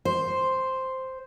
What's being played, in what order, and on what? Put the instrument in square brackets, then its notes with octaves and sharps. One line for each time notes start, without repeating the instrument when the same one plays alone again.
[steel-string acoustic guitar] C5